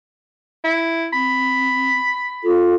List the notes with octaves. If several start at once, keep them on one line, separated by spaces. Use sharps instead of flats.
E4
C4 B5
F4 A4